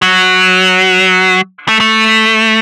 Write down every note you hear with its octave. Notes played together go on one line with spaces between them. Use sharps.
F#3
A3
A3